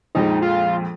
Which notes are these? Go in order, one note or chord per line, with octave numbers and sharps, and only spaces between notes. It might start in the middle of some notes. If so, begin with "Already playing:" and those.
A#1 F2 G#3 D#4
F4